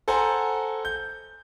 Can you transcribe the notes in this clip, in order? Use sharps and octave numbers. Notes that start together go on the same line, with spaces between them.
A4 C5 F#5 G#5 A#5
G6